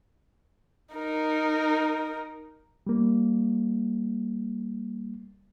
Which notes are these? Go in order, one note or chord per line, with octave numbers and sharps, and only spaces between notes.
D#4 A#4
G3 A#3